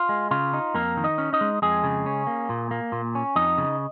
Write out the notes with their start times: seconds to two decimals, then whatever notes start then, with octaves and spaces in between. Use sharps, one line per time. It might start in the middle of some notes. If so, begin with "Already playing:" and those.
Already playing: F4
0.09 G#3
0.31 C#3 F4
0.53 D#4
0.74 F2 A#3 A#4
0.97 D#3
1.04 D#4 D#5
1.18 C#4
1.33 D#4 D#5
1.41 G#3
1.62 F2 G#3 G#4
1.83 C#3
2.06 C#4
2.27 A#3
2.49 A#2
2.71 A#3
2.92 A#2
3.15 C#4
3.36 F2 D#4 D#5
3.58 C#3